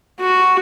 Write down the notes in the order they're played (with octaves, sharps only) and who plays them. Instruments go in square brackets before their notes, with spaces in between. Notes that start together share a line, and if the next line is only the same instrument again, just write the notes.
[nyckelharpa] F#4